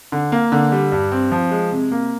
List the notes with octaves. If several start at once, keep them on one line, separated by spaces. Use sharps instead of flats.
D3
A#3
D3
G3
G2
C4
F3
G#3
C3
A#3